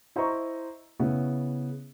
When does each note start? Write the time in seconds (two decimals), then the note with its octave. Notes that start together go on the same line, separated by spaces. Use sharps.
0.16 E4 C5 D#5 A#5 C#6
0.99 C#3 B3 E4